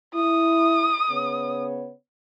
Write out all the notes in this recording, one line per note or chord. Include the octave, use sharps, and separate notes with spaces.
E4 D#6
C#3 B3 C#5